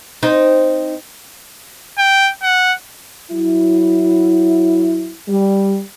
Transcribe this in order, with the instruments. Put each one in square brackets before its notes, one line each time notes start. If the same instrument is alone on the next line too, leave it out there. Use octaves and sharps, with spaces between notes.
[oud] C4 D#4
[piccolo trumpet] G5
F#5
[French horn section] F#3 E4
G3